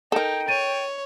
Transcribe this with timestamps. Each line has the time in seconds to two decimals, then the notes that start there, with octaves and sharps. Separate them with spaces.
0.12 D#4 A4 A#4 G5
0.48 C#5 A6 D#7